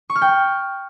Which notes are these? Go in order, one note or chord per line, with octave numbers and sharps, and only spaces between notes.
C#6
F6
G5